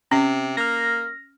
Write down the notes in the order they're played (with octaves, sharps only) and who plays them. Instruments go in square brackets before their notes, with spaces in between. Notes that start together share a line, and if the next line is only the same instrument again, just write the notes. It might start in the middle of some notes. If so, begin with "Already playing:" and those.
[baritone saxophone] C3 [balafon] C#4
[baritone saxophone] A#3 [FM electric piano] F6 A#6